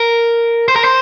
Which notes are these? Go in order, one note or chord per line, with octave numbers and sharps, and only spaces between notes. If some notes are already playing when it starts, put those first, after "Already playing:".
Already playing: A#4
C5
A#4
C5